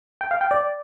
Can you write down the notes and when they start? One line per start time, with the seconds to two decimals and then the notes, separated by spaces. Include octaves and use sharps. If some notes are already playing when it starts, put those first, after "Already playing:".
0.21 G5
0.31 F5
0.41 G5
0.51 D5